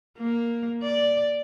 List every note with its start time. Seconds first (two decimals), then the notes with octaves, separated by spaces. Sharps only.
0.18 A#3
0.83 D5